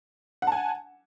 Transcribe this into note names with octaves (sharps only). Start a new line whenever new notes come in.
F#5 G#5 A5